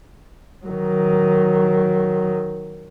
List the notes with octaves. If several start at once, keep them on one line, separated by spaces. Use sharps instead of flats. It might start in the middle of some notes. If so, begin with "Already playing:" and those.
D#3 F#3